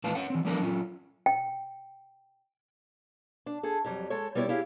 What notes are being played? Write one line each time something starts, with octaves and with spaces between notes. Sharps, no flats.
E2 A#2 G#3 B4 F5 A5
C#4 C#5 F#5
E3 C4
F3 G3 A3 B3 D4 A#4
F#3 C#4 F4
G5
D4
G#4 A4
F2 F#3 G3
G#3 A4 C#5
G3 B3 E4 A4 C#5 D5
E4 G4 G#4 F5